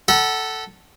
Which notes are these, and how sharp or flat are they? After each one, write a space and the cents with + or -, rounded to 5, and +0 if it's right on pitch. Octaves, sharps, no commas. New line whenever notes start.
A4 +0 F#5 +25 B5 -45